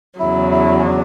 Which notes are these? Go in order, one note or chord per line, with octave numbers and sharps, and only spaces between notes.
E2 C#3 F#3 E4
E4
C#4
D4